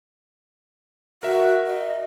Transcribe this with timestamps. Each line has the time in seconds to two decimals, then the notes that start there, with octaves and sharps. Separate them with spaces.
1.23 F#4 A#4 E5
1.67 D#5